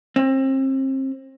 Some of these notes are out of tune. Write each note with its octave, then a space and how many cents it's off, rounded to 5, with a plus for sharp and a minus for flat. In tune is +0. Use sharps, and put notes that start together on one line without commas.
C4 +35